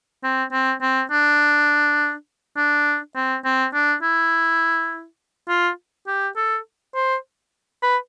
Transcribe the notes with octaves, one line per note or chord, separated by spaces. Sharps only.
C4
C4
C4
D4
D4
C4
C4
D4
E4
F4
G4
A4
C5
B4